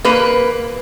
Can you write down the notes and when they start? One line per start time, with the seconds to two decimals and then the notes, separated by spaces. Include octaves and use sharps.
0.05 A#3 B4